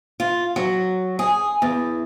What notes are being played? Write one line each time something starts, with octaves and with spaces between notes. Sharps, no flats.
F4
F#3
G#4
E2